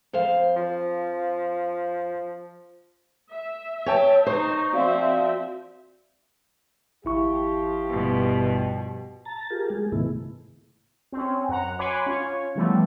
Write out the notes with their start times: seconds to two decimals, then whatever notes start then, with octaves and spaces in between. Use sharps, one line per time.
0.13 F2 C5 F5
0.56 F3
3.32 E5
3.86 C#5 G5 A5
4.27 D#4 C5 C#6
4.73 F3 C4 F#4 D5 E5 F5
7.05 G#1 F3 E4 G4 C#6
7.91 G2 B2
9.25 A5 A#5 A6
9.50 F4 G4 G#4 A#4
9.70 G#3 G#4
9.92 G#2 C3 D#3 A3 B3 E4
11.12 C4 C#4
11.49 F#2 F#5 A#5
11.79 C#5 F#5 G#5 B5 C6 D6
12.06 C#4 F4 C#5
12.55 C#3 E3 F3 G3 A3 B3